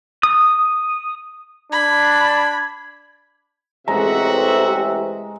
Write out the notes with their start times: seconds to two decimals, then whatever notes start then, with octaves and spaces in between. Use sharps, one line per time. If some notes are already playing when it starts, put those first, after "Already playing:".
0.23 D#6
1.72 D4 B5 G#6
3.88 A1 C3 G#3 F#4 E5 A#5